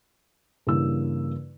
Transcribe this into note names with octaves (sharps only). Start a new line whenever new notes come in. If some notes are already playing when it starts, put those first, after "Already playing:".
G2 C#3 E3 A#3 E4 E6